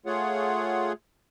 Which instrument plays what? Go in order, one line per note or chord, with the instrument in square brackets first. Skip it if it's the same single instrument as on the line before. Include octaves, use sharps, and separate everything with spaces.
[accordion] A3 F4 G#4 C#5 F#5